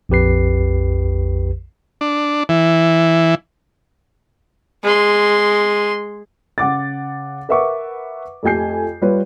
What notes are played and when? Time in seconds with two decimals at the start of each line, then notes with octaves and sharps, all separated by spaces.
0.09 A#1 F2 G4 B4 C7
2.01 D4
2.49 E3
4.83 G#3 C6
6.58 C#3 F#5 D6 A6
7.49 A#4 B4 E5 F#5 C#6 D6
8.43 F2 A3 G4 G#5 G6 C7
9.02 G3 F4 B4 C#5